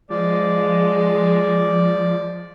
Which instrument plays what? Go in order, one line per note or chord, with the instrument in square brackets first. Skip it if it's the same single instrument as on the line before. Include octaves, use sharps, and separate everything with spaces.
[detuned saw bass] F3 [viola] G#3 [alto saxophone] D5